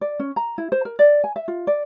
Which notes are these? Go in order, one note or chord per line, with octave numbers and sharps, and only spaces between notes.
D5
C#4
A#5
E4
C5
A#4
D5
G#5
E5
F4
D5